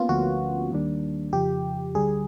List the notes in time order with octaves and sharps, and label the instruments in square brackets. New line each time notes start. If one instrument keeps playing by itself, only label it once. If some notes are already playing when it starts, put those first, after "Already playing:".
Already playing: [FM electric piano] A#3 B3 C#4 F4
[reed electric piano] D2 D3 F3 A3 [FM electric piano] F#4
[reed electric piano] D#2 D#3 G3 A#3 D4
[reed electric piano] F2 C#3 F3 [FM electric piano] G4
[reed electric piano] D2 D3 G3 [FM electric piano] G#4